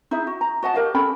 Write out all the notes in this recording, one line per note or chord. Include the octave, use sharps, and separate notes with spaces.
D#4 E4 G#4 E5
F#4
A#5
F#4 D#5 F#5 A5
G4 A#4 D#5 F5
C#4 A4 G5 B5